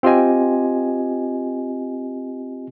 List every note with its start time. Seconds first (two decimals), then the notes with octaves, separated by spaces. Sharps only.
0.03 C4 F4 G4 D#5 G#5